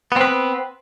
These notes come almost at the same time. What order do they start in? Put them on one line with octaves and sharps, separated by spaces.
B3 C4 B4